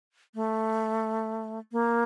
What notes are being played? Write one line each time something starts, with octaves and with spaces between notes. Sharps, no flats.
A3
A#3